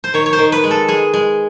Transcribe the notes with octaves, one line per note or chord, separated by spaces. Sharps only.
C5
D#3 C#5
C#5
C5
D#3
B4
G#3
A4
G#3 G#4
G#3